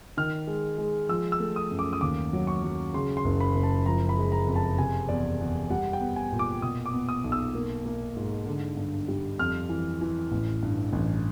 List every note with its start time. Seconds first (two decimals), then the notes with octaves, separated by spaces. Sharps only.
0.17 D#3 F6
0.47 G#3
0.78 G#3
1.09 F3 E6
1.32 E6
1.40 A3
1.56 D#6
1.71 F#2
1.79 D6
1.93 D#6
2.01 D#2 D6
2.33 F#3
2.47 C#6
2.64 F#3
2.94 C#3 C6
3.17 C6
3.25 F#1
3.41 B5
3.55 F#1
3.63 A5
3.86 F3 A#5
4.09 B5
4.17 G#3
4.32 A#5
4.47 F2
4.56 A5
4.78 C3 G#5
5.09 E2 D5
5.40 E2
5.70 G3 F#5
5.93 G5
6.01 B3
6.16 G#5
6.32 A#2
6.39 D6
6.62 B2 D#6
6.86 D6
6.93 B3
7.09 D#6
7.24 B1
7.32 E6
7.55 A#3
7.86 A#3
8.16 G#2
8.47 D3
8.77 G2
9.08 G3
9.39 F2 F6
9.69 E3
10.01 E3
10.31 A1
10.63 G2
10.93 A1